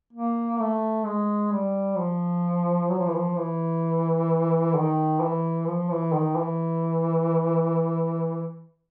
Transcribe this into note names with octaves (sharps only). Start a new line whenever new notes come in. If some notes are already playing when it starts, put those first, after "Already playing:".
A#3
A3
G#3
G3
F3
F#3
F3
E3
F3
E3
D#3
E3
F3
E3
D#3
E3